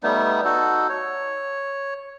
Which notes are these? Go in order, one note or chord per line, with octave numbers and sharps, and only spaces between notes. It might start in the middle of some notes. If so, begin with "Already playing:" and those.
G3 A3 B3 D#4
D#4 F#4 A4
C#5